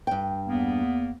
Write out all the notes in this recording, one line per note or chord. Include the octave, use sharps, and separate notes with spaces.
G2 G5
E2 A#3 B3